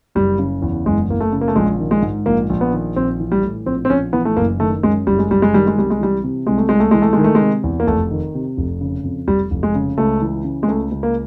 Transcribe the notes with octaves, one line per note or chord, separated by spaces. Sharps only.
F#1 G3
C#3
E2
F#1 G#3
F#1 A#3
A3
C#3
A#3
A3
A#1 G#3
D#3
G#3
G#2
A#1 A#3
A#1
B3
D#3
A#1 C4
E3
G3
A2
A#1 C4
C4
A#1 C#4
E3 B3
A3
F#1 A#3
D#3 A3
F#2 G#3
F#1 G3
G#3
F#1 G3
G#3
D#3 G3
G#3
C2 G3
G#3
E3 G3
C3
C2 G#3
A3
C2 G#3
A3
E3 G#3
A3
D#3 G#3
A3
G#3
C3
E2
A#3
F1 A3
D#3
C3
F1
C#3
F2
F1 G3
F1
G#3
C#3
C#2 A3
E3
C#3
G#3
C#2 A3
C#2
A#3